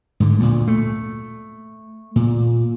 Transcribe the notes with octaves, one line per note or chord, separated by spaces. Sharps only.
G#2 D3
D2 A#2
A3
A#2